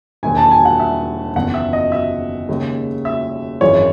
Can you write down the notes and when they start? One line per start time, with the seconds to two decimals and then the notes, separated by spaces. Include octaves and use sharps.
0.23 E1 D#2 D#3 G#5
0.37 A5
0.51 G#5
0.65 F#5
0.80 E5
1.35 F#1 E2 D#3 F#5
1.54 E5
1.73 D#5
1.92 E5
2.49 D#2 C#3 G#3
3.05 E5
3.61 G#1 F#2 E3 G#3 C#4 C#5